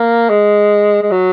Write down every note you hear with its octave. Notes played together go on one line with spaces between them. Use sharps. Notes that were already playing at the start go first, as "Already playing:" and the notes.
Already playing: A#3
G#3
G#3
F#3